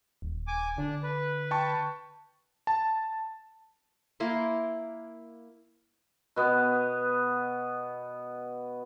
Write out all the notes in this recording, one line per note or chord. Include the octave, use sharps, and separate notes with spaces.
D#1
G#5 D6
D3 D4
B4
G5 A5 C#6
A5
A#3 E4 C6
B2 B3